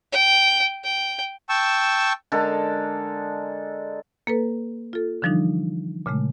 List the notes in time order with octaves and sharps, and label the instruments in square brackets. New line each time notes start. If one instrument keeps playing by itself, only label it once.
[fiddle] G5
G5
[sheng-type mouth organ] G5 A5 C#6 E6
[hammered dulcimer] D3 G#3 A4 A#4
[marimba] A#3 A4 B4
F4 A4
D3 E3 F3 G3 D4 D#4
A#2 C#3 G#3 A3